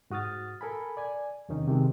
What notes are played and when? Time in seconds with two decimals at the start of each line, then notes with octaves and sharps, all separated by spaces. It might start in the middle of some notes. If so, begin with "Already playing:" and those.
0.10 G#2 F#4 D#6 F6 A6
0.61 A4 A#4 G#5 B5
0.97 D5 G#5
1.49 E2 C3 D#3 C#4 D#4
1.68 C3 D#3 G#3